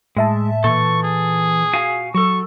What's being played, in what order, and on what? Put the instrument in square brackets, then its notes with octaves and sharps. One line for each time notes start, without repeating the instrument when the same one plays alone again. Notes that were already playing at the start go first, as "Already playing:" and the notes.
[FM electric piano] A2 E5 A5 [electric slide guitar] G#3
[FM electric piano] A#2 [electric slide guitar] E3 A4 [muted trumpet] C#6
[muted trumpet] G#4
[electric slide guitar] F#4 F5 G#5
[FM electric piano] F#3 [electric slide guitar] F#4 A4 [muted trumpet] C#6